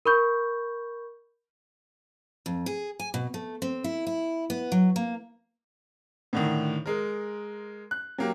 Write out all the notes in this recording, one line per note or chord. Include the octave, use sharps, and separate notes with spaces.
A#4 B5 C#6 G6
F2
G#4
G#5
B2
A3
C4
E4
E4
B3
F#3
A#3
A2 D3 D#3
G#3 A#4
F#6
F#3 A#3 G4